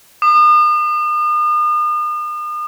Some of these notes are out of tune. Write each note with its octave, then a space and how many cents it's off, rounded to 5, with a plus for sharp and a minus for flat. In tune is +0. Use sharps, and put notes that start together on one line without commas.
D#6 -40